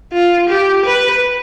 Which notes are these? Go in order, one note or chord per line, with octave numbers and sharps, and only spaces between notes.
F4
G4
B4